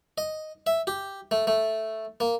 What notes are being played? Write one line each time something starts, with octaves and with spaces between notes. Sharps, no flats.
D#5
E5
G4
A3
A3
A#3